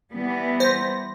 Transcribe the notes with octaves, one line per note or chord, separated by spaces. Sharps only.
E3 G3 B3
C5 A#6